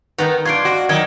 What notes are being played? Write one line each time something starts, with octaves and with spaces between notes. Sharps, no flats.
D#3 B3 D#4 A#5
G2 D4 F4 C5 G#6 C7 D7
F#4
D#3 F#3 G5 G#6